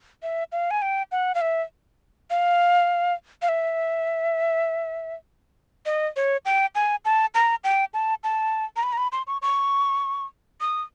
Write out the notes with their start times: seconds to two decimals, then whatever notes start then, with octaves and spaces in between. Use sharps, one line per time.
0.23 E5
0.52 F5
0.71 G#5
0.82 G5
1.12 F#5
1.35 F5
1.41 E5
2.30 F5
3.42 F5
3.49 E5
5.86 D#5
6.16 C#5
6.45 G5
6.75 G#5
7.05 A5
7.35 A#5
7.64 G5
7.94 A5
8.24 A5
8.76 A#5
8.83 B5
8.93 A#5
8.97 B5
9.12 C6
9.27 C#6
9.42 C#6
10.61 D#6